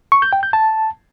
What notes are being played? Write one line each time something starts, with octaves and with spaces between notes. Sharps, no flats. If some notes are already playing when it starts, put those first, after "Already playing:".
C#6
G6
G5
G6
A5